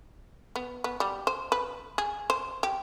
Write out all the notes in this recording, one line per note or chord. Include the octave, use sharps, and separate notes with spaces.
B3
B3
G3
C5
B4
G#4
C5
G4